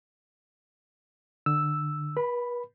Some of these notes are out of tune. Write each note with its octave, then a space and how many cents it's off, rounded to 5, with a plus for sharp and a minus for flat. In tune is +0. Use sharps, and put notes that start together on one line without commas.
D3 +25 E6 +0
B4 -40 B5 +0